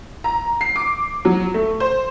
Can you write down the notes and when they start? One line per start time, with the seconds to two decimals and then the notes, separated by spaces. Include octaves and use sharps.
0.24 A#5
0.61 C7
0.76 D6
1.25 F#3
1.54 A3
1.80 C5